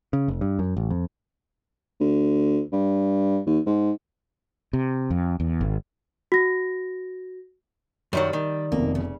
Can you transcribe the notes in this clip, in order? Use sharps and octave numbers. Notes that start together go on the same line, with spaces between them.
C#3
F1
G2
F#2
A1
F2
D2
G2
D#2
G#2
C3
F2
E2
G#1
F#4 A#6
F#2 D#3 F#3 G3
D#3
F1 F2 B2 A#3
C#3